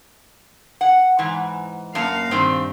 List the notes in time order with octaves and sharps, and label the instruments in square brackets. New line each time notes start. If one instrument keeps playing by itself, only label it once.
[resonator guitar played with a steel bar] F#5
G#2 E3
[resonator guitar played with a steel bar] F#2 A5 [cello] A#3 F5
[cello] G2 [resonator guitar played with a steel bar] A#2 D#3 C4